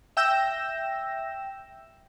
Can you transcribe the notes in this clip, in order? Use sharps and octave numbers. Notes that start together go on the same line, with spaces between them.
E5 G5 E6 G6 A#6 E7